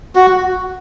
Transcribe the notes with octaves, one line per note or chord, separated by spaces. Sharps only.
F#4